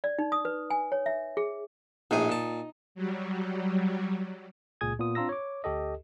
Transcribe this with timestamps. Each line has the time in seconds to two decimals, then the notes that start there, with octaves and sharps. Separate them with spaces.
0.04 D5
0.19 D#4
0.32 D#6
0.45 B4
0.70 G#5
0.92 C#5
1.06 E5
1.37 G#4
2.11 A#1 A2 D#4 G#4
2.29 A#2 A5
2.95 F#3 G3
4.81 C#2 A#2 G#4 G#5 D#6 G#6
4.99 A#2 B3 F4 D#6
5.15 C4 D4 F4 A#5 E6 A#6
5.29 C#5 D6
5.64 D2 G4 A4 D#5